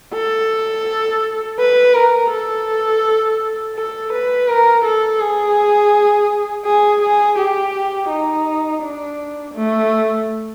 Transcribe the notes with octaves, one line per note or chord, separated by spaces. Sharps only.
A4
B4
A#4
A4
A4
B4
A#4
A4
G#4
G#4
G#4
G4
D#4
D4
A3